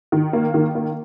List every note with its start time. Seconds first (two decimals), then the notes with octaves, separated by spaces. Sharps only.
0.12 D#3
0.33 A#3
0.54 D#3
0.75 A#3